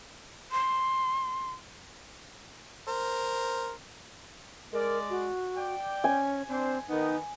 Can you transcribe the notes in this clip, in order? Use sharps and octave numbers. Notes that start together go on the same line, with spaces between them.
C6
A#4 C5
G#3 A#4 D5
F#4
D5 G5
C#4 G#5
C4 D4 C5
D#3 B3 D#4